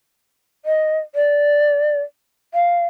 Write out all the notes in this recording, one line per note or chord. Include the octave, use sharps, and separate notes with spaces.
D#5
D5
F5